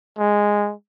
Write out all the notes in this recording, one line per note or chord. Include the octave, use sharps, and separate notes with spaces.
G#3